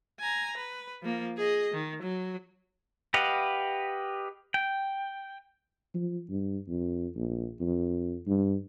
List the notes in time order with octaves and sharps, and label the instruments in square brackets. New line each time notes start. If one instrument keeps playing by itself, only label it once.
[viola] G#5 A#5
B4
F3 A#3
G#4 D#5
D#3
F#3
[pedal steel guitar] G4 B4 D#5 F5 F#5
G5
[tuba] F3
G2
F2
A#1
F2
G2